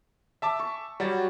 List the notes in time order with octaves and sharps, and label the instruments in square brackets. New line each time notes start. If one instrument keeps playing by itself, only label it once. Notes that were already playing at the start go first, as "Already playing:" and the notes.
[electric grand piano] E5 A5 D6
[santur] C#6
[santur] F#3 [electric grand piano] G3 F#4 A6